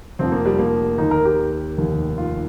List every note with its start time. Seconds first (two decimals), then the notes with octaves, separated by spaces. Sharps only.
0.19 F1 F2 F3 C4
0.32 A#3
0.46 G3
0.59 A#3
0.98 D#2 D#3 D#4
1.11 A#4
1.25 G4
1.39 G4
1.78 F1 D#2 D#3
2.18 F4